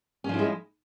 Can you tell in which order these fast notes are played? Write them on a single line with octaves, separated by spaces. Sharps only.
C#4 F3 E4 G#3